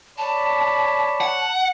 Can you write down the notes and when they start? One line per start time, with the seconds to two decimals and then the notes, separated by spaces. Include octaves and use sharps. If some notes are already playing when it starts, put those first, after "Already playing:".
0.18 C#5 D5 A5 B5
1.21 F#5